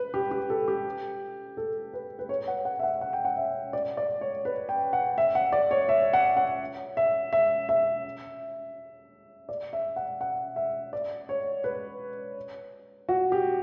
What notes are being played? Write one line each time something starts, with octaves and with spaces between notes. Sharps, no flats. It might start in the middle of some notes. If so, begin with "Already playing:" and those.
Already playing: B4
G4
G4
A4
G4
A4
B4
B4
C#5
F#5
F#5
E5
F#5
F#5
G5
F#5
E5
D5
D5
C#5
B4
G5
F#5
E5
F#5
D5
C#5
E5
F#5
F#5
E5
E5
E5
D5
E5
F#5
F#5
E5
D5
C#5
B4
F#4
G4